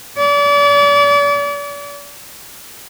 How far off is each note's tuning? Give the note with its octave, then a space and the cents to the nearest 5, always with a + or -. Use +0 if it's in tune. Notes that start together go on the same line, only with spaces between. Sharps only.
D5 -40